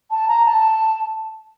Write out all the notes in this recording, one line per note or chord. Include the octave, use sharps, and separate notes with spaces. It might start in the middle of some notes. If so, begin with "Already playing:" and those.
A5
A#5
A5